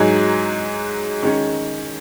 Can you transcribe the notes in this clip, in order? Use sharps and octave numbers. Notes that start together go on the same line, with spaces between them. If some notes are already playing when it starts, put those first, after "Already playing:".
Already playing: G#2 F#3 D#4 G#4
D#3 G#3 C#4